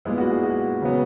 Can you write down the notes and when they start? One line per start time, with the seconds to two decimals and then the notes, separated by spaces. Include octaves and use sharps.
0.05 A#2 G#3 B3 E4
0.18 F#4
0.31 G#4
0.43 F#4
0.82 C#3 F#3 B3